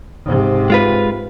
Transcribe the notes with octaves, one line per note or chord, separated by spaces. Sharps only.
G#2 C3
G#3 F4 B4